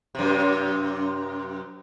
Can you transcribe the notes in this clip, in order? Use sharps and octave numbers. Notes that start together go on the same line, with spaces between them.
F#2 C3